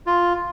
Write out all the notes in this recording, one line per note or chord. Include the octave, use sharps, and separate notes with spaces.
F4